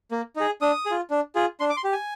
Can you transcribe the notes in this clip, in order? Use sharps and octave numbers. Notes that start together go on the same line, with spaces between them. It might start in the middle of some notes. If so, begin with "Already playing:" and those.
A#3
D#4 G#4
D4 D#6
G#4
F4
D4
F4 G#4
D4 C6
D6
C6
G4
G#5